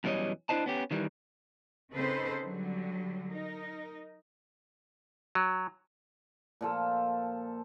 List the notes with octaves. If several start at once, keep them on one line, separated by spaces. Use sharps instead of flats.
F#2 B2 E3 G3 C#5 D#5
D4 E4 C5 D#5 A5
B3 C#4 G4
D#3 E3 G3
C#3 C4 D#4 A4 B4 C5
D3 F#3 G3
D#4 A#4
F#3
A#2 F3 A4